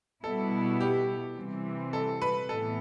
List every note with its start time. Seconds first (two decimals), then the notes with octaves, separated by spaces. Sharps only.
0.23 B2 G3 B3 E4 A4
0.81 G4
1.36 C3 E3 G3 C4
1.93 A4
2.22 B4
2.49 A2 E3 B3 A4